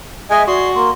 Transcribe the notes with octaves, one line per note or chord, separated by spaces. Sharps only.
G#3 D#5 E5 G#5
F#4 D5 C6
A#3 C6